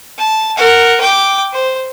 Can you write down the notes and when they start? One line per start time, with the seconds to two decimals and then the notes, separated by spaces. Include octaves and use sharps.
0.18 A5
0.57 A#4 F#5
1.01 G5 D6
1.53 C5